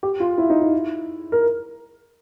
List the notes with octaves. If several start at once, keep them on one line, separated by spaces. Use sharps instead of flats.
G4
F4
E4
D#4
E4
A#4